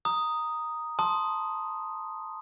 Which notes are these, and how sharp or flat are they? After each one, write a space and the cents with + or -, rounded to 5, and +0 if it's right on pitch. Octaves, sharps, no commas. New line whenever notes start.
A#5 +0 D#6 +0
A5 +0 C6 +0 D#6 +0